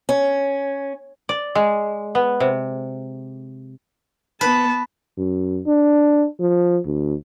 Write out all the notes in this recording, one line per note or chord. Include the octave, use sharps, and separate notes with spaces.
C#4
D5
G#3
B3
C3
B3 B4 A5
F#2
D4
F3
D2